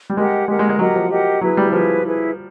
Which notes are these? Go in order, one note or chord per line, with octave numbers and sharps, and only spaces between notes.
G3
G#3 G4 A#4 D#5 F#5
G#3 G4 A#4 D#5 F#5
G#3
G#3
F#3 G4 A#4 D#5 F#5
F3
G4 A#4 D#5 F#5
F#3 E4 G#4 B4
G3
F3 E4 G#4 B4
E4 G#4 B4